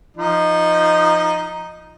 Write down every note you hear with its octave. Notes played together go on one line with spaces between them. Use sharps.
F3 D#4